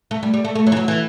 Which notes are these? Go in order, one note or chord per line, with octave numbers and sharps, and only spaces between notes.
A3
G3
G3
A3
A3
F#3
E3
F#3
E3